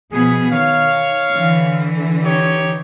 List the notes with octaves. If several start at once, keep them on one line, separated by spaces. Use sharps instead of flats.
B2 F3 B3 G#4
D#3 C#5 F5
D3 E3
D#4 G4 C#5